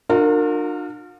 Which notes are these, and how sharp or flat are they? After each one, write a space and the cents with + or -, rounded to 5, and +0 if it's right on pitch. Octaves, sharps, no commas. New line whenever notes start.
D4 +40 F4 +45 A#4 -25